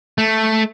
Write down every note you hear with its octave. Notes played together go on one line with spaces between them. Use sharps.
A3